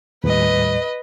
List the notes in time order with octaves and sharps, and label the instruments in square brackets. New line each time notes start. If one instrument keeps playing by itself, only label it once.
[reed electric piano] D#2 A2 G3 [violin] B4 D#5